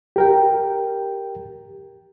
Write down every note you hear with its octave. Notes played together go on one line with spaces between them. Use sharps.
G4 A#4 G5